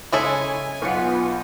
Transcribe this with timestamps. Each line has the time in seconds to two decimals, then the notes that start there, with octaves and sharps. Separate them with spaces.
0.12 C#3 G#3 E4 A4 C#5 G#5
0.82 B1 B3 F4 B4 F#5 C#7